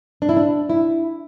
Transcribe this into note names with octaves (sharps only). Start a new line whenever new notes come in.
D4
E4
D4
E4